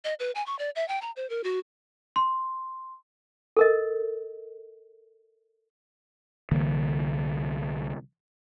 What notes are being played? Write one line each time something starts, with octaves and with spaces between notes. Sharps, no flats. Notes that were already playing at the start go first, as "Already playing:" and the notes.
D#5
B4
G#5
C#6
D5
E5
G5
A#5
C5
A#4
F#4
C6
A4 A#4 D#5
C2 D3 E3 A#3